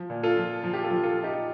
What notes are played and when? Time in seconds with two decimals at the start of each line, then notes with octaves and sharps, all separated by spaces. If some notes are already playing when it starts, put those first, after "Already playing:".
Already playing: F3
0.10 A#2
0.23 F4 A4
0.37 F3
0.63 F3
0.73 G4
0.84 F4 A4
0.90 F3
1.03 F4 A4
1.18 F3
1.23 D#4 G4